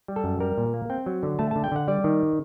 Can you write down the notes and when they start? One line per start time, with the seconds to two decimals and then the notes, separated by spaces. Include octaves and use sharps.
0.08 G3
0.16 A4
0.24 F#2
0.40 G3 A#4
0.58 A#2
0.74 A#3
0.90 C4 G5
1.06 F#3
1.23 D3
1.39 A3 A5
1.51 D3 A5
1.64 G5
1.72 D3 F#5
1.88 G3 D5
2.04 D#3